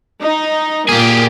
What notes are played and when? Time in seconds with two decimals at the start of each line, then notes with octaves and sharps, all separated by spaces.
0.22 D#4
0.89 A#2 A#3 G4 G#4